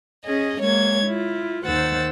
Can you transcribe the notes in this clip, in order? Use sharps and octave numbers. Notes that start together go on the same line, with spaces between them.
C#4 G#4 D#5
G#3 A#3 C#5 G#6
E4 F4
D#2 D#3 C5 F#5 E6 A6